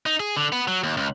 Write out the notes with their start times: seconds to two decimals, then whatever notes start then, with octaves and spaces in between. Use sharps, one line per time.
0.06 D#4
0.20 G#4
0.37 D3
0.52 B3
0.68 F#3
0.84 D#2
0.97 C#2